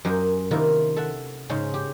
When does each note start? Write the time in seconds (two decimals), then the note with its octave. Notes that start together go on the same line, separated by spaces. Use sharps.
0.05 F#2 G4 A#4 C5 D#5 G#5
0.51 C3 D#3 A#3 E4 F4 A#4
0.96 A4 E5 F#5
1.49 G#2 C#3 G#3 C#4 C5
1.74 G4